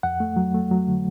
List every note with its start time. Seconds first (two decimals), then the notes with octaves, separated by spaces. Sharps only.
0.03 F2 F#5
0.20 A3
0.36 F#3
0.54 A3
0.71 F#3
0.88 D3